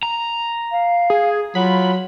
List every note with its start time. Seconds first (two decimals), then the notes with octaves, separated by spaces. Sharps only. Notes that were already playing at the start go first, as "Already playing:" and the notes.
0.03 A#5
0.72 F5
1.10 G#4
1.55 F#3 F4 B5